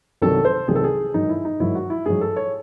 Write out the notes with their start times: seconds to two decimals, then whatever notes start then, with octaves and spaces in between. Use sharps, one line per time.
0.22 C2 C3 D#3 F#3 A4
0.45 C5
0.68 C2 C3 D#3 F#3 G#4
0.76 A4
0.84 G#4
1.14 G#2 D#3 F#3 D#4
1.29 E4
1.45 D#4
1.60 G#2 D#3 F#3 E4
1.75 F#4
1.90 E4
2.06 G#2 F#3 G#4
2.21 A4
2.37 C#5